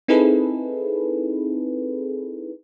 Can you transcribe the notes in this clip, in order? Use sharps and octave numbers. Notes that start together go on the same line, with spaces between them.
C4 D#4 E4 G#4 A4 B4